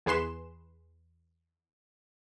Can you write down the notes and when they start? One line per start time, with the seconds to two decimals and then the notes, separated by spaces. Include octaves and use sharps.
0.06 E2 G#4 B4 C6 E7